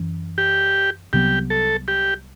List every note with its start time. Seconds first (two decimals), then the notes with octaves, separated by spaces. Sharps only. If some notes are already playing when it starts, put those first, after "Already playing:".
Already playing: F#2 E3
0.38 G4
1.13 C2 C3 F#3 B3 G4
1.50 A4
1.88 G4